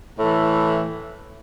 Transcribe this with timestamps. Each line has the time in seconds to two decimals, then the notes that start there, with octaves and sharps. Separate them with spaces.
0.17 A2 E3 A4